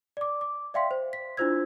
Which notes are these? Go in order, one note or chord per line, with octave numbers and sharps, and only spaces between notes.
D5 D6
D6
D5 E5 F5 G5 C6 B6
C5
B6
D4 E4 F4 C5 E6 G#6